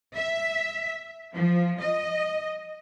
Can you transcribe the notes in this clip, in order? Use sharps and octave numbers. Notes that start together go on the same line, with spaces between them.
E5
F3
D#5